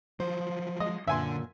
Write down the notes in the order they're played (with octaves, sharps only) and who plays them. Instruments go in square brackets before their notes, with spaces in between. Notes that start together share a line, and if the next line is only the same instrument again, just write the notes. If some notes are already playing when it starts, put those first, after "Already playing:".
[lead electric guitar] F3 F#3 [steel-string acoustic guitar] C5
[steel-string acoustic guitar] G#3 [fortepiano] D#5
[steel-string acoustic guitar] F#2 A#2 [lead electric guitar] D3 [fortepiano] E5 G#5 C6